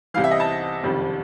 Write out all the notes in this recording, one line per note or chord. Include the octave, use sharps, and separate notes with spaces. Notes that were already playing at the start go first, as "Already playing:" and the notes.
C2 C3 E3 F5
E5
D#5
A5
F#1 F2 C3 D#3 G3